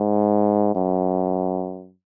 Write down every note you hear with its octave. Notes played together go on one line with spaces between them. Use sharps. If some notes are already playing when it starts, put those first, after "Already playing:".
Already playing: G#2
F#2